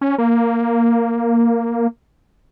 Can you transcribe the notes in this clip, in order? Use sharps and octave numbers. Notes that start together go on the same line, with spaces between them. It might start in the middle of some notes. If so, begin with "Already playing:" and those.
C#4
A#3